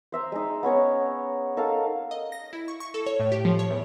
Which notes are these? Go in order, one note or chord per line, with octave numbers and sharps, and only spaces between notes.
C5 E5 A#5
G#3 D#4
B3 C#4 C#5 A#5
D#4 A4 A#4 F5
D#5
A#6
E4
C#6
C#6
A4
C#5
A2
G4
F3
C#5
E2